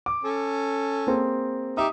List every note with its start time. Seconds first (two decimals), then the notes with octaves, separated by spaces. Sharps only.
0.06 D6
0.24 C#4 A4
1.07 A#3 C4 G#4
1.77 D#4 G4 E5 D#6